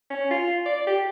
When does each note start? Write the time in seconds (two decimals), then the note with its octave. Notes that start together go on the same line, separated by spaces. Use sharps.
0.10 C#4
0.31 F4
0.66 D5
0.87 G4